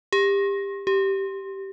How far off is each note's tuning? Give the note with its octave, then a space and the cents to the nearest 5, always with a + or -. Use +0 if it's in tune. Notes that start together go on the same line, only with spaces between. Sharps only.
G4 +25
G4 -10